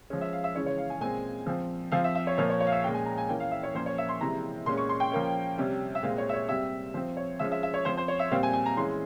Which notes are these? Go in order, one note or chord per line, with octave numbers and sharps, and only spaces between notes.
F3 G#3 C#4
E5
F5
E5
C#3 E3 G#3 C#4 C#5
C#5
F5
G#5
A#2 G#3 C4 G#5
F3 C4
F3 C4 F5
E5
E5
C#5
A#2 F3 A#3 C#5
C#5
C#5
F5
E5
A#2 G#3 C#4 G5
G#5
A#5
G#5
E3 A#3 C#4 G5
F5
E5
C#5
A#2 F3 A#3 C#4 C5
C#5
E5
C6
C3 E3 G#3 A#5
A#2 G#3 C#4 C6
C#6
C6
G5
F3 A#3 C#4
C3 G3 C#4
E5
A#2 G#3 C4 F5
C#5
E5
C#5
C3 G3 C4 E5
F3 C4 C5
C#5
F3 G#3 C#4 E5
E5
E5
C#5
F3 C4 C5
C5
C#5
E5
A#2 G3 C4 F5
G#5
G#5
A#5
E3 G#3 C#4 C6